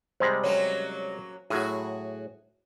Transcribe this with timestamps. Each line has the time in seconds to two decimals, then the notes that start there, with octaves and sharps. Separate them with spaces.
0.20 C3 G3 G#3 C5 C6
0.43 F#3 A#3 C#4 C#5
1.50 A2 F#3 F#4 G#4